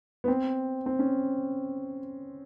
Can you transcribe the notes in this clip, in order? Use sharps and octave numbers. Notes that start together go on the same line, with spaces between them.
B3
C4
C4
C#4